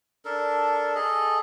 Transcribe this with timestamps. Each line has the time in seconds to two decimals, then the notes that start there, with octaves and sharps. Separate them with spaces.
0.25 D4 A4 A#4
0.95 G#4 A4 D#5